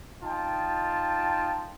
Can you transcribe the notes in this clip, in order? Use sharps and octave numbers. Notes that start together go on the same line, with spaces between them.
D#4 F4 G5 A5